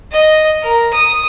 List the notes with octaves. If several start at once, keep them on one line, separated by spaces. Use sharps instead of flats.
D#5
A#4
D#6